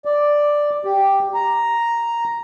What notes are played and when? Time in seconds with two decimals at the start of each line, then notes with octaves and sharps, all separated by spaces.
0.05 D5
0.85 G4
1.34 A#5